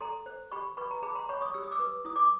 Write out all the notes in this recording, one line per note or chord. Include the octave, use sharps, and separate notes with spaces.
A4 A#5 C6
C5
G4 B5 C#6
B4 B5 C#6
A#5
G#4 A5 B5
A#5 C6
C#5 B5 C#6
C#6 D#6
G4 E6
D#6
D6 E6
B4
E4 D#6
D6